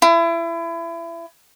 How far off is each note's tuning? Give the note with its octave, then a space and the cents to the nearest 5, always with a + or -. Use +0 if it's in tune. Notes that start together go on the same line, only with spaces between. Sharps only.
E4 +30